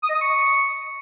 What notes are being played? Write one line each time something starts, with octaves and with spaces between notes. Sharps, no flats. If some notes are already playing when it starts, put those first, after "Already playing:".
D#6
D#5
D#6
C#6